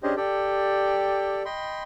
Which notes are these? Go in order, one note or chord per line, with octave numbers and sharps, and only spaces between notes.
C#4 D4 G4 G#4 C5 D#5
G4 A4 D5 G5
D#5 G5 B5 C6